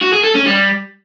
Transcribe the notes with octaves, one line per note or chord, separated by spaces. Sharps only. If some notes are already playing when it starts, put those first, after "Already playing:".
F#4
G#4
A4
C#4
G3